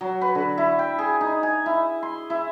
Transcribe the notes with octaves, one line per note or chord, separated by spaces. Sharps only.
F#3
B4
D3
E4
G5
G#4
D#4
G#5
E4
C6
E4